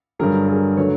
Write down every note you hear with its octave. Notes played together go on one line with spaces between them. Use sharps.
G2 D3 F#3 G#4 A#4
G#4 A#4
D3 F#3 A3 B4 C#5